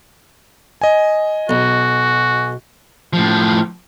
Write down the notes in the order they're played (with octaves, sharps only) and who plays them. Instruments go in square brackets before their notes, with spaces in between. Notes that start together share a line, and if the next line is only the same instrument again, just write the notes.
[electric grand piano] D#5 G#5
[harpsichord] B1 [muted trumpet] F#4
[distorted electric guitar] A2 F3